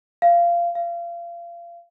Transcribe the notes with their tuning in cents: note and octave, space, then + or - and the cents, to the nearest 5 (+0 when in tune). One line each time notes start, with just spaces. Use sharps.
F5 -20
F5 -30